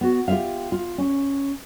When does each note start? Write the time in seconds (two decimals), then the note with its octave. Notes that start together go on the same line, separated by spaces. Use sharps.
0.01 B3 F#4
0.28 F4 G4 B4 E5 F5
0.72 F4
0.98 C#4